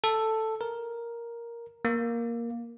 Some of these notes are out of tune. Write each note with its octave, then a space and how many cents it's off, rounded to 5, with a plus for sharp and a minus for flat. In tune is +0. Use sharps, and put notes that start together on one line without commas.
A4 +5
A#4 +5
A#3 +5